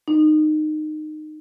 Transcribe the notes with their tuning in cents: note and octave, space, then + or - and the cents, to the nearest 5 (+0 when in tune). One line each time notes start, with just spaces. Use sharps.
D#4 -20